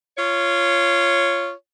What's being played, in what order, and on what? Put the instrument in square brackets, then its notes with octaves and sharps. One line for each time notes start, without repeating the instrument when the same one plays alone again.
[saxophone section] F4 C#5